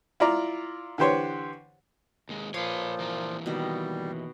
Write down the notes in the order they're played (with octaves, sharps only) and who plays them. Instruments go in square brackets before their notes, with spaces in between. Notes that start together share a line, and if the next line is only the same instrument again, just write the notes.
[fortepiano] E4 F4 D5 A#5
D3 E3 G4 C5 C#5
[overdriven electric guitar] D#2 G#3
[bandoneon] A#2 F3 [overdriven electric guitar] B4 C#5 [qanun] C6 D6
[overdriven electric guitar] E3 A#3
[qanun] B2 D#3 [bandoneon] G3